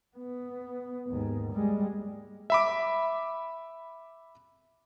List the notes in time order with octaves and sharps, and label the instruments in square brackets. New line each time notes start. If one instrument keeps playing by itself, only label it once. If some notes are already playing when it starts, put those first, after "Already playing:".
[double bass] B3
D#2 G#2
G3 G#3
[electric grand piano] E5 B5 D6